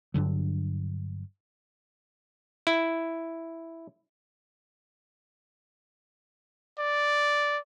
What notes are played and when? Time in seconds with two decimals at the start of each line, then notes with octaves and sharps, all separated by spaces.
0.14 G2 D3 F#3
2.67 E4
6.79 D5